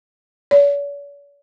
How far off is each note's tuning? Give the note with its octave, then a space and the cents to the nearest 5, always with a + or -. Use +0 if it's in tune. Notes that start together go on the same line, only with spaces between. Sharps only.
C#5 +45